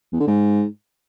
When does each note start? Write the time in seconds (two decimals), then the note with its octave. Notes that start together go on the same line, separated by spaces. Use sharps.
0.13 E2
0.20 D3
0.28 G#2